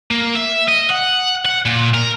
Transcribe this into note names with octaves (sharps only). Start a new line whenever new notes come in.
A#3
E5
D#5
F#5
F#5
A#2
A#4